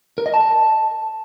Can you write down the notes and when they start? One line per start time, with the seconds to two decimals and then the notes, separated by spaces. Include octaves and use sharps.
0.18 A#4
0.26 D#5
0.34 A5